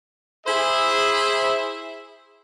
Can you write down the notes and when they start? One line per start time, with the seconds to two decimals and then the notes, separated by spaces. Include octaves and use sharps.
0.46 E4 G#4 C5 E5